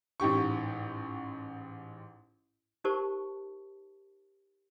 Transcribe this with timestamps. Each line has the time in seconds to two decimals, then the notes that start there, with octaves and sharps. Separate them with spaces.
0.20 A1 G#2 G4 C#6
2.84 D#4 G4 A#4 C5 A5 C#6